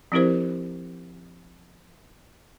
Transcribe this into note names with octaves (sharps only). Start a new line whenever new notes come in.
F3 C4 E4 G4 A#4 C5